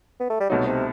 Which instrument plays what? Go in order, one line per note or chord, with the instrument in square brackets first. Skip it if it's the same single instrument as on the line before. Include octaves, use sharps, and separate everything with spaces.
[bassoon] B3
A3
G3
[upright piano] C2 B2 A3 D#4 [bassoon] F#3
[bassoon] C3